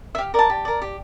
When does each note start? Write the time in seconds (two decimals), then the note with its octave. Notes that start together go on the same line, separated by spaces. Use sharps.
0.15 E5
0.18 G4 F5
0.34 A#4 D5 A5
0.50 G4
0.65 A#4 D5
0.82 G4